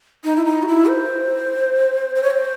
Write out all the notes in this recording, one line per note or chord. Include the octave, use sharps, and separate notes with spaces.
D#4
E4
D#4
F#4
E4
C5
C5
C#5
C5